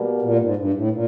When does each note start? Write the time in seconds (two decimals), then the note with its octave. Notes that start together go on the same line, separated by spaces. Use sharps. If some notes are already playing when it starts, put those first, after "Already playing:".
Already playing: B2 G3 A#3
0.22 A#2
0.39 G#2
0.56 G2
0.73 A2
0.91 A#2